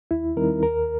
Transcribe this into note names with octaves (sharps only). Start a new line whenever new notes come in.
D#2 E4
D#3 G3 C4 D#4 A#4
D#2 A#4